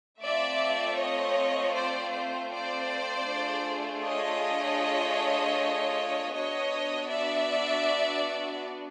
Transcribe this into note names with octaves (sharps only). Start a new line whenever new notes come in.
A3 C4 F4 D5 E5
C#5 D#5
C5 D5
C5
C5 D5
A3 D4 F4 G#4
C#5 D#5
B3 D4 F#4 C#5 D#5
D5 E5